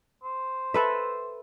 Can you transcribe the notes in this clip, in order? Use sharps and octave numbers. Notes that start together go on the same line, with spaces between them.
C5
A4 B4 E5